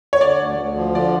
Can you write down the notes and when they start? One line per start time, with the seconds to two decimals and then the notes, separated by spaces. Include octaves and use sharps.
0.13 C#5
0.21 D3 D5
0.40 D2
0.58 D2
0.77 F3
0.95 D3 D5